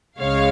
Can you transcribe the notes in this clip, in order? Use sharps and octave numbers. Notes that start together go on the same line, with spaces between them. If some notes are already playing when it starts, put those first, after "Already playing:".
C#2 C#3 G#3 C#5 F5